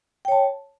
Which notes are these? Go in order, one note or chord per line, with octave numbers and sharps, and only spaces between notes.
C#5 G5 A5